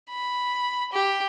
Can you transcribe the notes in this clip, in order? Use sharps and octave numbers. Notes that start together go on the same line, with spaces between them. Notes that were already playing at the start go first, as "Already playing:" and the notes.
B5
G4